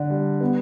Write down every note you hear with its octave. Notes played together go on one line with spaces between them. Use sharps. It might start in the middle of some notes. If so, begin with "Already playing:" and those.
Already playing: D3 D4
G3
B3